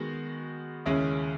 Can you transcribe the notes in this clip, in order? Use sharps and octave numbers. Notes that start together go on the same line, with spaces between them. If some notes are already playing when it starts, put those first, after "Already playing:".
Already playing: D#3 G#3 B3 F#4
D#2 C#3 G#3 C#4 E4